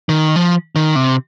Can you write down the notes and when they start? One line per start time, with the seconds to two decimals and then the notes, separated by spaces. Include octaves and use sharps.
0.09 D#3
0.36 F3
0.76 D#3
0.96 C3